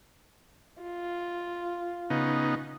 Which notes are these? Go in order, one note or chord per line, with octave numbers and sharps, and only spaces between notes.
F4
C#3 B3 D#4